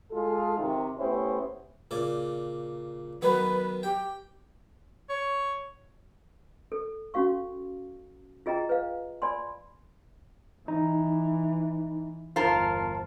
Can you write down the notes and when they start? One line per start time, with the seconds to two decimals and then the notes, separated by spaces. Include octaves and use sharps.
0.11 G#3 F4 G#4 A4
0.57 C3 D#3
0.98 A3 B3 C#4 E4 G4 C5
1.91 A#2 C#3 D5
3.22 D#3 F#3 B3 B4
3.83 G4 G5
5.09 C#5
6.72 A4
7.14 C#4 F#4 F5 C#6
8.46 F4 G#4 D#5 G5 A#5
8.69 B4 F5
9.22 D5 G#5 B5 C6
10.68 E3 D#4
12.36 G1 E2 F4 A#4 C5 A5 C7